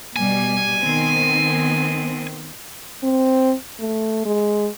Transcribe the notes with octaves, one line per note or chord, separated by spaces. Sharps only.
B2 G3 G#5
D#3 B3 C4
C4
A3
G#3